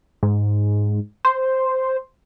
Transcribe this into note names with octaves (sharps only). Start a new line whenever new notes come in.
G#2
C5